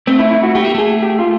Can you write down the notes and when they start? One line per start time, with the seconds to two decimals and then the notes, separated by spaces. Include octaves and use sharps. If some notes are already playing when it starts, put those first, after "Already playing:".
0.07 A3 C4
0.19 E4
0.31 E4
0.43 F#4
0.55 A3 G4
0.64 A#3
0.75 A3 G#4
1.03 G4
1.19 F4